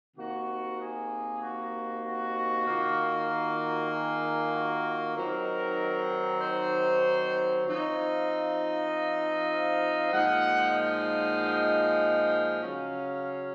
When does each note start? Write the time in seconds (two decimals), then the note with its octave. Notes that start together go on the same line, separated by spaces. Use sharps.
0.17 C3 D#3 A#3 F#4
0.79 G#4
1.41 F#4
2.04 F#4
2.66 D#3 A#3 F4
3.28 F#4
3.59 F#4
3.90 G#4
4.52 F#4
5.15 D#3 F#3 C4 D#4 A#4
6.40 C5
7.64 F3 C4 D#4 C#5
7.95 F5
9.50 F5
10.13 A#2 F3 G#3 D#4 F#5
11.07 F#5
12.62 C#3 F#3 C#4 F5